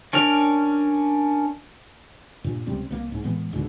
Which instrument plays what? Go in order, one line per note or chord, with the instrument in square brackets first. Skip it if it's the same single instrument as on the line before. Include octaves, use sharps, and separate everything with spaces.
[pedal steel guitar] C#4 D4 A#4 F6
[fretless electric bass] G2 A#2
C#2 C3 G3 C#4
C2 F#3 A#3
C2 G#2
A2 E3 G#3 B3
C#2 G#2 B2 D3